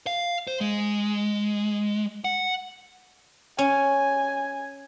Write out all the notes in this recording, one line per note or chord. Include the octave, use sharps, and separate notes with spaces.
F5
C5
G#3
F#5
C#4 G#5